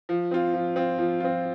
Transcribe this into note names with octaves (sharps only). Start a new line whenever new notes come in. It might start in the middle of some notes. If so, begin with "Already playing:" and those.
F3
C4 F4
F3
C4 F4
F3
C4 F4